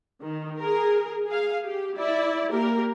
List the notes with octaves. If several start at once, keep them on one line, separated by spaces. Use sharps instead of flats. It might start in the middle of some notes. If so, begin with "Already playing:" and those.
D#3
G#4 A#4
G#4 F5
G4
E4 D5
A#3 G4 A#4